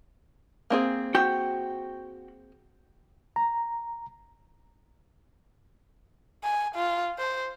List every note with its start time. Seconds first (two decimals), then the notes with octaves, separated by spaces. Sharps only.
0.70 A#3 C4 G#4
1.15 F#4 G5
3.36 A#5
6.44 G#5
6.75 F4
7.19 C5